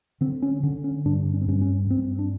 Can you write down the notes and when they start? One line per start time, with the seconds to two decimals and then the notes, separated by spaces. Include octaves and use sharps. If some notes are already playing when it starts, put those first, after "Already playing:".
0.21 D3 C4
0.42 C#4
0.63 D3 C#4
0.84 C#4
1.05 G2 D4
1.34 C#4
1.41 C4
1.48 G2 C#4
1.61 C#4
1.90 G2 C4
2.19 D4